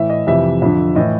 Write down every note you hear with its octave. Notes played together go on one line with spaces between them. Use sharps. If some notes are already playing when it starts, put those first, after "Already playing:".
Already playing: A2 E3 E5
D#5
F2 C3 E3 E5
F2 D3
A2 E3 D#5